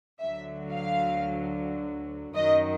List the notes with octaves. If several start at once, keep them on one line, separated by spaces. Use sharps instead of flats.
D2 D3 F#3 E5
F5
F#2 D#3 F#3 D#5